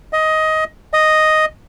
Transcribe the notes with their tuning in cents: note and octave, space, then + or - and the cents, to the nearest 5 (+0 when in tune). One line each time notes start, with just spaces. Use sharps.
D#5 +15
D#5 +0